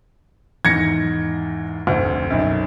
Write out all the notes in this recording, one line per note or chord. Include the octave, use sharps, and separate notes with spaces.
E2 G#2 D#3 G#6 A#6 C#7
F1 D2
B1 F#2